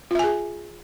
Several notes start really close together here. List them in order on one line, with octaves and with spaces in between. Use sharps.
F4 E5 G#5 G#4